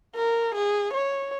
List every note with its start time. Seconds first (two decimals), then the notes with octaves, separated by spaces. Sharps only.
0.15 A#4
0.55 G#4
0.93 C#5